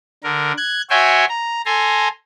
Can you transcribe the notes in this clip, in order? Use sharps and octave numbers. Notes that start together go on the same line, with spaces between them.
D3 A#4
F#6 G#6
F#4 C#5 E5 G5 G#5 C6
A#5
A4 G#5 A#5 C6